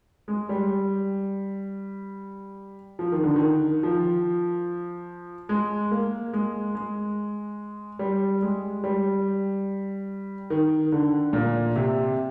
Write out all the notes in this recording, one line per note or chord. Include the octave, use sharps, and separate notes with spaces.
G#3
G3
F3
D#3
D3
D#3
F3
G#3
A#3
G#3
G#3
G3
G#3
G3
D#3
D3
A#2
C3